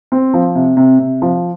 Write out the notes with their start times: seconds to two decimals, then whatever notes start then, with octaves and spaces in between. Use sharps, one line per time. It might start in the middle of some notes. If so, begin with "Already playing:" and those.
0.12 C4
0.34 F3
0.55 C3
0.77 C3
0.99 C3
1.22 F3